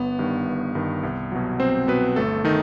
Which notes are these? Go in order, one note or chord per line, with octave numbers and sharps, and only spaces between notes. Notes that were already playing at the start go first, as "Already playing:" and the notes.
Already playing: G1 B3
G2 D#3
G1
G2 D#3
C2
B2 F#3
C2 C4 C5
B2 F#3 B3 B4
G1 A3 A4
D#3 D#4